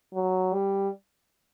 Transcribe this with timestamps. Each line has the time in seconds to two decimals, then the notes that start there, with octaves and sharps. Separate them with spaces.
0.14 F#3
0.53 G3